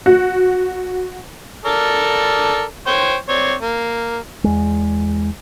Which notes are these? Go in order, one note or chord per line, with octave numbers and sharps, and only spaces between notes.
F#4
A4 A#4 D5
C5 C#5 G5
C4 C#5 D5
A#3
E2 G#3